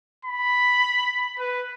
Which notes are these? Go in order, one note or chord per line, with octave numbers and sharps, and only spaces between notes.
B5
B4